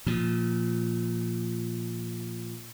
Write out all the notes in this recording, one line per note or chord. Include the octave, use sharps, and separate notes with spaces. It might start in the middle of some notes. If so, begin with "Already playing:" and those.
A#2 F3